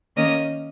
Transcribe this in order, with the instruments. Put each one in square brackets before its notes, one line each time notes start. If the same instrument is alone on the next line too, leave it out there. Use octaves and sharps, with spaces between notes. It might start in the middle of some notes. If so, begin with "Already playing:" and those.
[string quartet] D#3 A#3 C#4 D#5